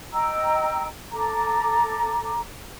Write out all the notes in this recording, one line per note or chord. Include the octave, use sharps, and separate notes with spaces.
D#5 G5 A#5 E6
A4 A#5 D6